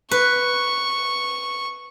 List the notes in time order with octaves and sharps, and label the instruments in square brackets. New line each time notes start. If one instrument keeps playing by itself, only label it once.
[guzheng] B4 [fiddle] C#6